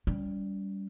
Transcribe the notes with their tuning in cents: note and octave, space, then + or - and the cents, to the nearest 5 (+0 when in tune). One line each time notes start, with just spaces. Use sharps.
G3 +0 C#4 +40